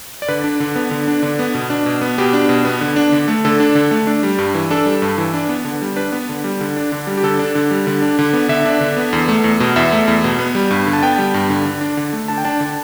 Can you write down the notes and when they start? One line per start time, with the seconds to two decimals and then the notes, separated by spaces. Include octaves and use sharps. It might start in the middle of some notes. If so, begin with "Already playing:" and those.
0.22 D5
0.28 D3 B4
0.44 D4
0.60 D3
0.76 B3
0.91 D3
1.08 D4
1.23 D3
1.39 B3
1.54 B2
1.70 D4
1.86 B2
2.01 B3
2.18 B2 G4
2.33 D4
2.49 B2
2.65 B3
2.81 D3
2.96 D4
3.12 D3
3.28 A3
3.45 D3 A4
3.60 D4
3.75 D3
3.91 A3
4.07 D4
4.23 G3
4.38 G2
4.54 E3
4.70 D4 A4
4.86 G3
5.02 G2
5.18 E3
5.34 D4
5.49 B3
5.65 D3
5.82 G3
5.96 D4 B4
6.12 B3
6.29 D3
6.44 G3
6.61 D3
6.76 D4
6.92 D3
7.07 G3
7.17 G4
7.23 D3 A4
7.39 D4
7.55 D3
7.71 G3
7.87 D3
8.02 D4
8.19 D3
8.33 B3
8.49 D3 E5
8.66 D4
8.81 D3
8.97 B3
9.13 E2
9.29 A3
9.44 E2
9.60 B2
9.76 E2 E5
9.92 A3
10.08 E2
10.24 B2
10.39 B3
10.55 G3
10.71 G2
10.87 D3
10.93 A5
11.03 B3 G5
11.18 G3
11.34 G2
11.50 D3
11.65 D3
11.81 D4
11.97 D3
12.13 A3
12.28 D3 A5
12.38 G5
12.45 D4 A5
12.60 D3